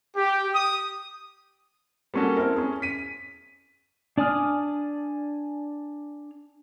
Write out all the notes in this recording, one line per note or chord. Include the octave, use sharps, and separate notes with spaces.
G4
D#6
G3 A#3 C#4 F#4 A4
C4 E4 A4 A#4
C#4 G#4
B6 D#7
D4 D5 G#5 D#6 F6